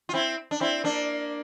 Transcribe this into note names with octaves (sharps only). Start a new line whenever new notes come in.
F4
C4 E4
D4
C4 E4
A#3 D4